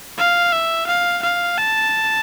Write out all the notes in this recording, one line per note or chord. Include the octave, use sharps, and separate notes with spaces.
F5
E5
F5
F5
A5